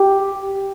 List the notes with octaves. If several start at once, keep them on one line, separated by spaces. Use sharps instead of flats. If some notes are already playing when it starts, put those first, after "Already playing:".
Already playing: G4